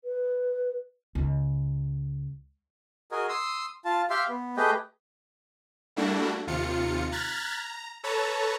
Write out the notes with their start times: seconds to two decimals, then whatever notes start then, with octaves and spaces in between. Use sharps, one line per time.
0.04 B4
1.15 C#2
3.12 F#4 G#4 A#4 D#5 G#5
3.29 C6 D#6 E6
3.85 F4 A5
4.10 G4 E5 F5 G5 C6
4.29 B3
4.57 A3 G4 G#4 B4 D#5 G5
5.96 G3 A3 A#3 D4 E4 F#4
6.47 D#2 C3 F4 C#7
7.12 A#5 F6 F#6 G#6 A6 B6
7.55 A#5
8.03 A4 B4 C#5 A5 A#5